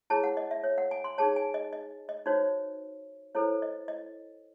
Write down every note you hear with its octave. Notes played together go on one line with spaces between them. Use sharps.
E4 G#4 C#5 A5
F#5
D#5
E5
C#5
F#5
G#5
C6
D#4 G#4 C#5 A5
G#5
D#5
D#5
D#5
D#4 F#4 C5 C#5
E4 A4 C5 C#5
D#5
D#5